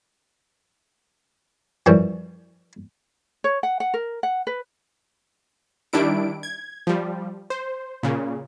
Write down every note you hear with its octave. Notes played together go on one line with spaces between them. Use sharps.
F#2 E3 F3 G3
C#5
F#5
F#5
A#4
F#5
B4
D#3 G3 D4 E4 D7
G#6
F3 G3
C5
A#2 C#3